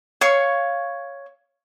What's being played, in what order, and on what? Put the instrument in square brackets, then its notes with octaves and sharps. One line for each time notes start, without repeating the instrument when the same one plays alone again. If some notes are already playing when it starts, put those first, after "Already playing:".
[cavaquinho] C#5 F5 C#6